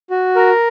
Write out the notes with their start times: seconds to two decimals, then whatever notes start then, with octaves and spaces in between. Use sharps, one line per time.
0.10 F#4
0.36 A#4